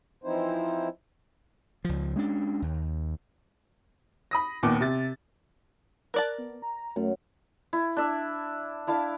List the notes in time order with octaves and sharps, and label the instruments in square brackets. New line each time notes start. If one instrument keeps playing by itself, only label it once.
[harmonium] E3 F3 C4 D#4 E4 C5
[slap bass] C#2 F3
G#3 C#4 D4
D#2
[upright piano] B5 D#6 A#6
A#1 D#2 B3 D6
C3 A6
[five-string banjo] A#4 D5 A5 [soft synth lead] F#6
[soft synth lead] B3
A#5
[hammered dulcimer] F#2 [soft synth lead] A3
[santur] E4
D4 E5
D4 E4 F5 A5